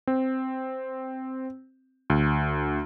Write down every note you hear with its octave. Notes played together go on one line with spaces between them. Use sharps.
C4
D2